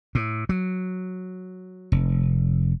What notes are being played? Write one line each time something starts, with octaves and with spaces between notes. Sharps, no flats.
A2
F#3
F1